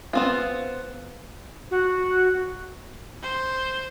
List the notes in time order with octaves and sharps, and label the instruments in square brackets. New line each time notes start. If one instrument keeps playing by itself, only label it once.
[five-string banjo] B3 C4 F4
[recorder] F#4
[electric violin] C5